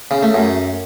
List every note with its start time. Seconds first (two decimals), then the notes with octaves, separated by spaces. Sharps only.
0.11 C#3
0.23 A3
0.34 F#2